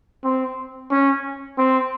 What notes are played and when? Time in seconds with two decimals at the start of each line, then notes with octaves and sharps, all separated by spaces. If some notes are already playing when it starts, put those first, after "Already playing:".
0.24 C4
0.91 C#4
1.58 C4